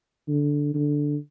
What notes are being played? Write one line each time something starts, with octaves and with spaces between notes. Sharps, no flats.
D3
D3